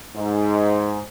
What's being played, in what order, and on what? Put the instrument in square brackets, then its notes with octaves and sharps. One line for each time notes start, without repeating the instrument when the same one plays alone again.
[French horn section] G#2